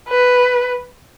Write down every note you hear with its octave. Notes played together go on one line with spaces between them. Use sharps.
B4